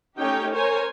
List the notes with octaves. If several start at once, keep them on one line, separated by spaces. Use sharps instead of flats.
A3 C#4 D#4 G4 C#5 G5
A#4 C5 C#5 G#5